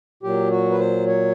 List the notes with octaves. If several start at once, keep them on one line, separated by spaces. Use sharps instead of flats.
A#2 F#3 G4
F#4
B4
C5
C#5